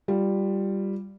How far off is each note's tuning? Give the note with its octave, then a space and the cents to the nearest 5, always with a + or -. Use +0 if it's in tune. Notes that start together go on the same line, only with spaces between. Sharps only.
G3 +0 F4 +0